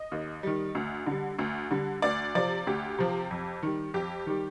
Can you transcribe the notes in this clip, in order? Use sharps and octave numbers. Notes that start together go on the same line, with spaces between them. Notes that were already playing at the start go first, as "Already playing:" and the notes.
Already playing: D#5
D#2
D#3 G3
D2
D3 G3
D2
D3 G3
D2 D5
C3 F3 D5
D2 G4
C3 F3
F2
D#3 G3
F2 G4
D#3 G3